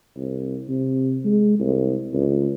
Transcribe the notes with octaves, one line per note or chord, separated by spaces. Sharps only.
C2
C3
G#3
C2
C#2